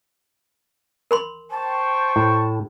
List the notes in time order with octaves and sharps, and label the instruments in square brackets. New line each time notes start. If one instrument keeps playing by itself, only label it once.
[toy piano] A#4 B5 C6
[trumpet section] C5 G5 C#6 [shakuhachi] A5
[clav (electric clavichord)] A2